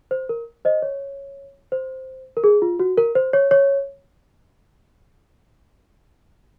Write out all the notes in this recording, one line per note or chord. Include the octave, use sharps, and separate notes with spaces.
C5
A#4
C5 D#5
C#5
C5
A#4
G#4
F4
F#4
A#4
C5
C#5
C#5